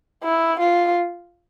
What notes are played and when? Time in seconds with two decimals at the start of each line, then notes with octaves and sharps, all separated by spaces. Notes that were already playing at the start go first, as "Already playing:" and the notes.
0.23 E4
0.60 F4